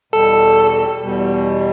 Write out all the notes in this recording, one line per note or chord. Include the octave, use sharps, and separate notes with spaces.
E2 B2 G3 A4
E2 B2 G3